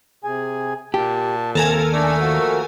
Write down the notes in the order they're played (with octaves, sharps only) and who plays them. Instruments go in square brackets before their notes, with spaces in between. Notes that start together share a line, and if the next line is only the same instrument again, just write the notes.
[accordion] C3 G#4 G#5
[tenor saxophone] A#2 [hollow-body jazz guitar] G4 [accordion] A5
[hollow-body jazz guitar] D#2 [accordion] C3 F3 [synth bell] A4 A#4 G#5
[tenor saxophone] A3 [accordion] D4 D5
[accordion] F3 A#3 F#4